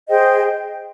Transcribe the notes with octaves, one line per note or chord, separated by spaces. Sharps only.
G#4 C5 D#5 G5